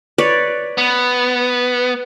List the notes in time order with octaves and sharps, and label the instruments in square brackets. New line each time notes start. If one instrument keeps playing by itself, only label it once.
[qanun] B4 C#5 D5
[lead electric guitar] B3